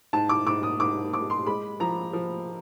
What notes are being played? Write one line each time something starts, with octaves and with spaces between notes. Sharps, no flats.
G#2 A5
D6
G#2 D6
D#6
G#2 D6
G#2 D6
C6
G#3 B5
F3 A#5
F3